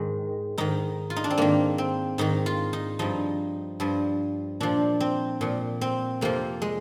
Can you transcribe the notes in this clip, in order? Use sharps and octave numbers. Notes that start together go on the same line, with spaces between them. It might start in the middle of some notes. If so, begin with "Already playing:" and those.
Already playing: G#2 D#3 G#3
G#2 D#3 D#4
F4
D#4
D4
C4
G#2 D#3 A#3
C4
G#2 D#3 D#4
F4
D#4
G2 F3 D#4
G2 F3
A#2 F3 D4
C4
A#2 F3
C4
F2 C3 F3 A#3
G#3